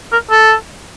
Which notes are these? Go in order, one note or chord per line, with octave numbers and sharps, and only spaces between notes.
A#4
A4